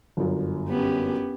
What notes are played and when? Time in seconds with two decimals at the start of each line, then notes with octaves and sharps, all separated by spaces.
0.17 G1 F#2
0.69 B3 C#4 G4